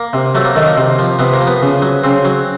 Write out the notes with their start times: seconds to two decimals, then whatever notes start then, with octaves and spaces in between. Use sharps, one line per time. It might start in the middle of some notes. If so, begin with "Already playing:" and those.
Already playing: A#3
0.13 C3
0.35 F#3 A3
0.45 A#3
0.55 D#3 A3
0.67 A#3
0.77 C3
0.99 F3
1.19 C3 B3
1.33 A#3
1.41 F3
1.47 B3
1.62 C#3
1.82 F#3
2.04 C#3 C4
2.25 F#3